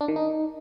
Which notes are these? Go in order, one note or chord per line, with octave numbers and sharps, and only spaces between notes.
D4
D#3
D#4